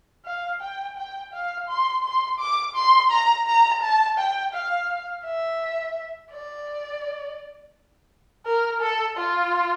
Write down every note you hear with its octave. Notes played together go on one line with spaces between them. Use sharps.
F5
G5
G5
F5
C6
C6
D6
C6
A#5
A#5
A5
G5
F5
E5
D5
A#4
A4
F4